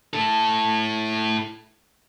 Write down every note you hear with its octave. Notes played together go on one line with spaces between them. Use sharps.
E4 A4